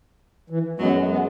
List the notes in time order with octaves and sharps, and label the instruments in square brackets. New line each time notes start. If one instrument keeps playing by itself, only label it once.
[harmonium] E3
[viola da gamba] F#2 F#3 [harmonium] G#3 B3
[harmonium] G#3 B3